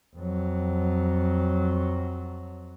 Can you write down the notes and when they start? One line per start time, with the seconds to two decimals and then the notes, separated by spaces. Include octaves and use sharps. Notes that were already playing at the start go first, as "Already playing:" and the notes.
0.16 F2 F#3